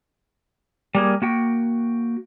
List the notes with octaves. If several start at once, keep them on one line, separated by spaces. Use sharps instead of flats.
G3 A#3 G#4
A#3 F#4 G5